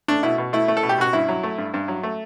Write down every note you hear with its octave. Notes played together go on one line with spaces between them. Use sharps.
A3 D4
B2 E4
B2
A3 E4
A3
A4
B2
G4
B2 F#4
G2 E4
F#3
A3
G2
G2
F#3
A3